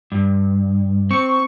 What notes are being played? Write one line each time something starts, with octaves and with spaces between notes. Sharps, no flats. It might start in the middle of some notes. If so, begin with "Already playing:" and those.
G2
C4 C#6